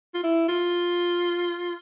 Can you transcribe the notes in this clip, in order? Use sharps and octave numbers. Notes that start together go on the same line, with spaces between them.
F4
E4
F4